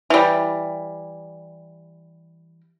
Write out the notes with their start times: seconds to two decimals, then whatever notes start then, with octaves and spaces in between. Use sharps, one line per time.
0.10 E3 G3